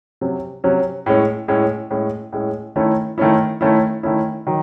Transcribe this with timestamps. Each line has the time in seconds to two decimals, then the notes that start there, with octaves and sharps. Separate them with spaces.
0.21 C3 F#3 C#4
0.64 C3 F#3 C#4
1.06 A2 G#3 C#4
1.48 A2 G#3 C#4
1.90 A2 G#3 C#4
2.32 A2 G#3 C#4
2.76 D#3 A3 C#4 E4
3.18 D#3 A3 C#4 E4
3.61 D#3 A3 C#4 E4
4.03 D#3 A3 C#4 E4
4.47 D#3 F#3